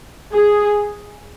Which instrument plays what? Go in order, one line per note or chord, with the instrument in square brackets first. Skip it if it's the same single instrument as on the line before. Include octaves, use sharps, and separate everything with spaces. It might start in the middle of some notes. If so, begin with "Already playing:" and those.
[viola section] G#4